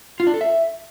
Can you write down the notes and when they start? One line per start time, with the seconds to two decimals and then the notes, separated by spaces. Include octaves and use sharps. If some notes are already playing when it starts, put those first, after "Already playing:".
0.20 F4
0.27 D4
0.34 A4
0.41 E5